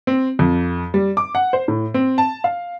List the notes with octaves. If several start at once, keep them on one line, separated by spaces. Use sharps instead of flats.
C4
F2
G3
D6
F#5
C5
A2
C4
A5
F5